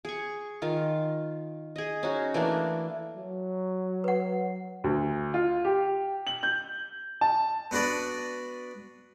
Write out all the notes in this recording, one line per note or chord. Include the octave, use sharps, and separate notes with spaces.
G#4 C#6
D#3 F4
G#4 D#5
C#4 D#4 F#4
E3 A3 A#3 D4
F#3
B4 F#5
D2
F4
G4
F#7
G6
A5
B3 D4 F#4 B4 D5